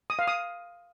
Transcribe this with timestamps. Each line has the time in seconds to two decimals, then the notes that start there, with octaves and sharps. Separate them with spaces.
0.10 D#6
0.19 F5
0.28 D#6